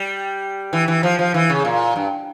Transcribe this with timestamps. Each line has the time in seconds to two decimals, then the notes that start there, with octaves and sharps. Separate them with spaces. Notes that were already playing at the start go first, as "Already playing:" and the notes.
Already playing: G3
0.73 E3
0.88 E3
1.03 F3
1.19 F3
1.34 E3
1.49 C#3
1.65 A#2
1.96 G2